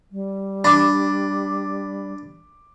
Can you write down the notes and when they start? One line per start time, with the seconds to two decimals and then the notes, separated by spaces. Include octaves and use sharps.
0.12 G3
0.64 D4 B5 D6